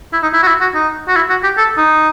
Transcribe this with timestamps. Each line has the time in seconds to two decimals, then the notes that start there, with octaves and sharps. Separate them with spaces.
0.13 E4
0.23 D#4
0.34 E4
0.43 F#4
0.48 E4
0.61 F#4
0.75 D#4
1.08 F#4
1.16 E4
1.30 F#4
1.44 G4
1.57 A4
1.78 D#4